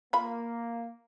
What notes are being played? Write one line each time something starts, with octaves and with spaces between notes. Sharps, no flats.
A#3 F4 B5